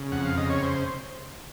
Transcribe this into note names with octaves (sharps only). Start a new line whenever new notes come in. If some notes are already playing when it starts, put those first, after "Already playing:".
Already playing: C#3
F2 F#5
F5
C#3 D#5
C#5
C5